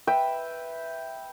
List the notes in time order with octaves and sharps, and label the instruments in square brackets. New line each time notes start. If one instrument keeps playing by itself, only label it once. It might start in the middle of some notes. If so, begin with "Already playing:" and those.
[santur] B4 E5 G5